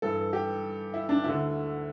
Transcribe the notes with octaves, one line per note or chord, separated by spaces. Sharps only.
G2 E3 A4
G4
E4
D4
D2 D3 E4